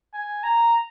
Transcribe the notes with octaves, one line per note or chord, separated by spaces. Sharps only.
G#5
A#5